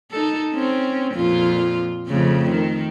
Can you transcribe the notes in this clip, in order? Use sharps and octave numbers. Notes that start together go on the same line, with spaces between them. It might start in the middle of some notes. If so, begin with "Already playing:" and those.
D#4 A4
C4 C#4
F2 A#2 F4
F2 C#3 A3
D#3